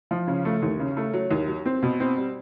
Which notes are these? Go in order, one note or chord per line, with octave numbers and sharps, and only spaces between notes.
F3
C#3
A3
D#2
C#3
A3
F#3
D#2
F#3
C4
B2
C4
G3